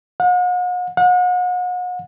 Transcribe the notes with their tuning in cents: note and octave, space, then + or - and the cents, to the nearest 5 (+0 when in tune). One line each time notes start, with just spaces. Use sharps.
F#5 -45
F#5 -40